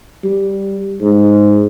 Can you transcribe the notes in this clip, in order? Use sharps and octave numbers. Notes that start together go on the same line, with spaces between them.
G3
G#2